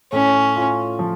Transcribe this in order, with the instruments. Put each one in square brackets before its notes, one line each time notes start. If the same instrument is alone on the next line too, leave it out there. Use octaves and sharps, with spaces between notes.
[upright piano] A2 [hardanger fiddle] C#4
[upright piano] F4
F3